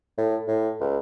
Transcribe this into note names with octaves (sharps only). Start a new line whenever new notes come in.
A2
A2
C#2